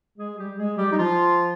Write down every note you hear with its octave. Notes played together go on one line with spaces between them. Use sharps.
G#3 G#4
G3 G4
G#3 G#4
G3 G4
D#4
F3 F4